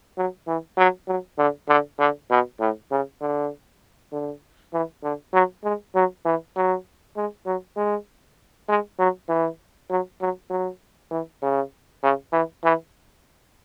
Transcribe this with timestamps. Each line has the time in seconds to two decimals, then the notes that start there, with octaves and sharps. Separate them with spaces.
0.18 F#3
0.48 E3
0.78 F#3
1.08 F#3
1.38 D3
1.69 D3
1.99 D3
2.30 B2
2.60 A2
2.91 C#3
3.21 D3
4.12 D3
4.73 E3
5.03 D3
5.33 F#3
5.64 G#3
5.95 F#3
6.25 E3
6.56 F#3
7.17 G#3
7.46 F#3
7.77 G#3
8.69 G#3
8.99 F#3
9.29 E3
9.90 F#3
10.21 F#3
10.50 F#3
11.11 E3
11.43 C#3
12.03 C#3
12.33 E3
12.64 E3